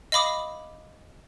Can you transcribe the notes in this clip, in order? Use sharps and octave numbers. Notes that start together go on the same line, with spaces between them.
D#5 F5 B5 D6 D#6